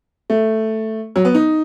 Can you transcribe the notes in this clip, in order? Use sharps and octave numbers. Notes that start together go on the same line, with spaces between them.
A3
F#3
B3
D#4